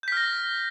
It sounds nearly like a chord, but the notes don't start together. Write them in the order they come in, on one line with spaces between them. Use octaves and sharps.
G6 B6 F6 A#6